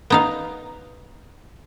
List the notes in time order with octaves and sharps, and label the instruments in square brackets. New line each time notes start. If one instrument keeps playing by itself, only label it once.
[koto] B3 D#4 F5